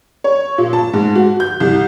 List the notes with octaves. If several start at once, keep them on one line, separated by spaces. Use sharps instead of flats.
C#5
A#2
A5
G#2
F#4
G6
C2